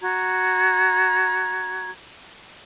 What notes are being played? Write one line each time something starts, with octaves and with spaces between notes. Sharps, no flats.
F#4 A#5 G#6